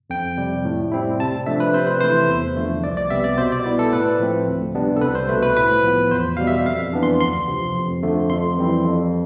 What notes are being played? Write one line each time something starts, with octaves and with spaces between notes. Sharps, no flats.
F2 G5
C3 G3
A2
G3 C4 E4
C3 A5
F3 A3 D4 E5
B4
C3 C5
B4
E3 A3 E4 C5
E2
D3 F3 A3
C2 D5
D5
C3 G3 B3 E5
D5
B2 C5
D5
B3 E4
A4
A2 B4
F3 A3 C4
D2
C3 G3 B3 D4
A4
C2 B4
C5
B2 A3 B4
B4
A2 B4
F3 B3
E2 C5
B2 G3 F5
E5
F2 F5
E3 B3 D4
C6
D2 C6
C3 F3
F2
D3 F3 A3
F2 C6
E3 G3 C4 E4
F2